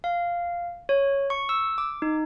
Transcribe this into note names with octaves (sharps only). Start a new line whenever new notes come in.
F5
C#5
C#6
E6
D6
D#4